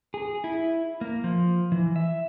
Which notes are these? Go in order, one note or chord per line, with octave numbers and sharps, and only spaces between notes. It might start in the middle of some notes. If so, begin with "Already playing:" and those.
G#4
E4
A#3
F3
E3
E5